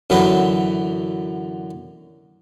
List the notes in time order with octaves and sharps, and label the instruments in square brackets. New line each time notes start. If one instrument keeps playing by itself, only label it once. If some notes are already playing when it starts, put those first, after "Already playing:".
[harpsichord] F#2 D3 E3 F#3 B4 D#6